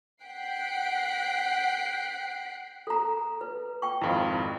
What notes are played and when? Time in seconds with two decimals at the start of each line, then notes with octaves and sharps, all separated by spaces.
0.23 F#5 G5 F#6 B6 C7 D7
2.87 A4 A#5
3.41 B4
3.82 G5 C#6
4.01 G#1 F2 E4 F5